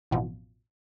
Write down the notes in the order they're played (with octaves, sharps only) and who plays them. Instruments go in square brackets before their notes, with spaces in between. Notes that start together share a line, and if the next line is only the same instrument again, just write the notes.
[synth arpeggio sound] A1 F2 B2 F3